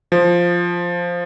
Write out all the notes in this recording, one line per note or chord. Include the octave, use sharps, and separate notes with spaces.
F3